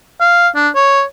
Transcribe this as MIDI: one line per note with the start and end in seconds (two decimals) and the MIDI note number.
0.21 0.48 77
0.56 0.69 62
0.75 1.03 73